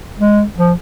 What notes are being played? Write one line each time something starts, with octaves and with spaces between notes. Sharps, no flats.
G#3
F3